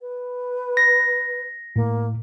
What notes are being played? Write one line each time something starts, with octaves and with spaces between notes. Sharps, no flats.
B4
A#6
A2 A#3